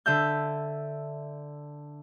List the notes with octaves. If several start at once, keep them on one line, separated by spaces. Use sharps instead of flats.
D3 E5 G6